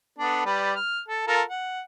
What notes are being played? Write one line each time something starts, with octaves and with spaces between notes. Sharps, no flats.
B3 D4 A4
G3 B4 D5
F6
A4
F4 A4 A#4
F#5